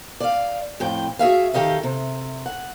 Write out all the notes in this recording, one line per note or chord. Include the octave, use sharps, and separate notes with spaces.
D5 F5
F2 A2 G5
F#4 G#4 E5 F5
D#3 G4 A4 D#5 F5
C3
F#5